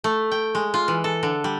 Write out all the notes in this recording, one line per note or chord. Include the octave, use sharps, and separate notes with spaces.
A3
G5
G#3
F4
E3
A4
D3
G3